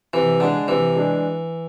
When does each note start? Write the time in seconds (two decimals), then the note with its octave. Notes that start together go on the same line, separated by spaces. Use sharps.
0.13 C3 E3
0.40 D3 G#3 D4 G#4
0.68 C3 E3
0.96 G#3 D4 G#4